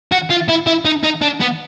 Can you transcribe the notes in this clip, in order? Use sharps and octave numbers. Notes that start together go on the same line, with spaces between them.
F#4
F4
E4
E4
D#4
D#4
D4
B3